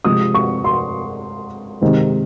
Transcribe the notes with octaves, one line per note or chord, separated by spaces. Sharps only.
C3 F3 G#3 C4 D#6
C#6
C6
C3 D#3 G#3 C4